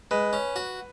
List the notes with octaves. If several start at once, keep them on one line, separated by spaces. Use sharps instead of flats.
G#3 B4
C#4
F#4